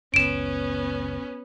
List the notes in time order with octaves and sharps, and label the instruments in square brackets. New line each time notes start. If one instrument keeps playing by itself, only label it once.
[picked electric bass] F#1 C#2 [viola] B3 C#4 [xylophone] D7 E7